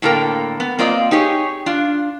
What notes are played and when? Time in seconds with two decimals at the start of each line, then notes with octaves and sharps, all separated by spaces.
0.02 A2 D3 A#3 A4 A#4 G5
0.60 B3
0.79 A#3 C4 F4 D5 D#5
1.11 D#4 G4 G#4 C#5
1.66 D4 F4